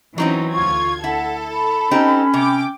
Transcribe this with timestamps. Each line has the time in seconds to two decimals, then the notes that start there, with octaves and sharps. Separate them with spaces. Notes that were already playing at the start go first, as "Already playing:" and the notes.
0.18 E3 F#3 C4 C#4 D#4
0.54 D2 F4 C#6 G#6
1.04 E4 A4 F#5
1.54 B5
1.91 C4 C#4 D#4 G4
2.34 C3 G5 D6